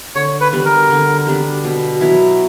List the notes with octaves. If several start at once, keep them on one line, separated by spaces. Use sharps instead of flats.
D3 C#5
B4
G3 B3 D4
A#4
D3
G3 B3 D4
B2
F#3 B3 E4